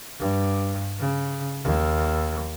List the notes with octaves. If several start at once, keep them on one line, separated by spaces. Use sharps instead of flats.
G2
C#3
D#2